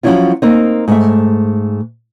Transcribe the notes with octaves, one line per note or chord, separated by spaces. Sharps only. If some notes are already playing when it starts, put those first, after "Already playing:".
F3 F#3 C4 C#4 E4 F4
A#3 C4 D#4
G#2 A3 E5